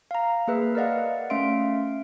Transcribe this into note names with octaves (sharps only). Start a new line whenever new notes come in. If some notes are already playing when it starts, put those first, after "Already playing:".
F5 A#5
A#3 G#4 B4 E5 E6
A#4 B4 D5 D#5 F5 F#5
A3 C#4 E5 F5 C6 D7